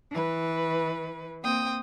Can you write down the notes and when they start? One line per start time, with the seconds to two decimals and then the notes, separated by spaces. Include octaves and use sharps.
0.12 E3 B4
1.44 A#3 C4 G5 D#6